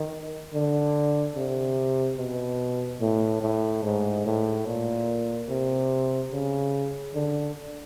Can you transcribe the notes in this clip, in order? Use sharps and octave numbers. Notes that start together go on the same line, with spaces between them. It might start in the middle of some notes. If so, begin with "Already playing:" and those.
Already playing: D#3
D3
C3
B2
A2
A2
G#2
A2
A#2
C3
C#3
D3